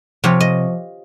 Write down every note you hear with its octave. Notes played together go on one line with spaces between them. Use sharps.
C3 F3 C4 C#5
D#5